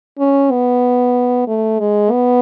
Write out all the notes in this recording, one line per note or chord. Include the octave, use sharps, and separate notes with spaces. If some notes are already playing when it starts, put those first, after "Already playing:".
C#4
B3
A3
G#3
B3